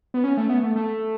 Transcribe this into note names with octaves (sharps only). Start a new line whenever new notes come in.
B3
C#4
A3
B3
A3
A3